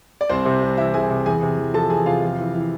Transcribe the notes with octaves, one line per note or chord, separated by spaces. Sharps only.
D5
C2 C4 C5
C3
C2
E3 E4 E5
C2 G#4 G#5
C3
E2 G#4 G#5
C3
E2
F3 A4 A5
E2 G#4 G#5
C3 F4 F5
F2
E3
E3